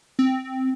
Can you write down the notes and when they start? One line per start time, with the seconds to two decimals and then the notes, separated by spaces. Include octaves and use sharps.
0.19 C4